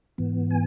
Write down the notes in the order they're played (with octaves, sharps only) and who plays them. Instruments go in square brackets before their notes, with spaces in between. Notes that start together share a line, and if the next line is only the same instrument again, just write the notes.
[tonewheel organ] G#2 E3 B3
G#5